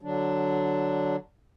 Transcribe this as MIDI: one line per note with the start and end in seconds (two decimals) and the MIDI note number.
0.02 1.16 50
0.02 1.16 54
0.02 1.16 62